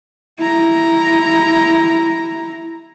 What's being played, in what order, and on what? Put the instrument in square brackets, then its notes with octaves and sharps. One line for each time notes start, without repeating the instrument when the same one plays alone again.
[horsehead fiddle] E4 A#5